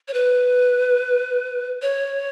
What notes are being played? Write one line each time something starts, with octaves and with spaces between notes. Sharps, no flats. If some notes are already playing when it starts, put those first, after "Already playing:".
C#5
B4
C#5